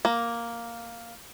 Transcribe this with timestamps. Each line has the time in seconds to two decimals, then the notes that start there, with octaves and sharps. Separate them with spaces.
0.05 A#3